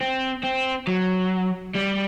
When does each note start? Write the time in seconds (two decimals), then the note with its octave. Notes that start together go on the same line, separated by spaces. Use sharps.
0.01 C4
0.44 C4
0.87 F#3
1.75 G3